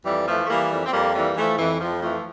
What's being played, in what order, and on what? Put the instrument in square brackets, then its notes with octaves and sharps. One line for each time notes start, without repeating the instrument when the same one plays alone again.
[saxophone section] F2 E3 G3
E3 F3 A3
A3
E3 G3 A#3
F2 G3 A#3
C4
F2 G3 A#3
E3 G3 A#3
E3 F3 A3
F2 E3
F2 F3
E3 F3 A3